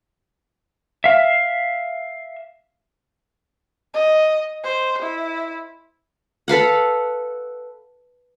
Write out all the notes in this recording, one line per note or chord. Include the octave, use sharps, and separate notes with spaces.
E5 F5
D#5
C5
E4
A4 B4 F5 F#5